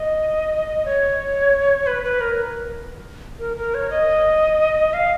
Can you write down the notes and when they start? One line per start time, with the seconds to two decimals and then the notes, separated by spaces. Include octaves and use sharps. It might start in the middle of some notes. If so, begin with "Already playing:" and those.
Already playing: D#5
0.85 C#5
1.87 B4
2.04 B4
2.21 A#4
3.39 A#4
3.57 A#4
3.74 C#5
3.90 D#5
4.93 F5